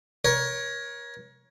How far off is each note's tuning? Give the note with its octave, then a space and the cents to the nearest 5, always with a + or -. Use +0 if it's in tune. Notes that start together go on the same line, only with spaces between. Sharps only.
A#4 +30 C#5 +0